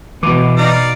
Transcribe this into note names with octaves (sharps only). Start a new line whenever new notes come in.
B2 E3 D6
D#4 D5 F5